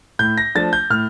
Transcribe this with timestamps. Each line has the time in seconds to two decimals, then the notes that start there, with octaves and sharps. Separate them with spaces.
0.19 A2 G6
0.38 A#6
0.55 F3 A3 D4 A6
0.73 G6
0.90 A2 F6